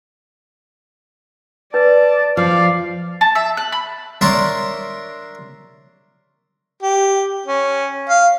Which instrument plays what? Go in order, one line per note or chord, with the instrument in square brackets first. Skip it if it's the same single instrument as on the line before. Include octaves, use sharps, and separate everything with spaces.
[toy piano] B4 [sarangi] D5 [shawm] A5
[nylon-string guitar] F3 [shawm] D5 [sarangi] F5
[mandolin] A5
E5
F#6
B5
[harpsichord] D4 A#4 C#5 E5 A5 C6
[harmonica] G4
C#4
F5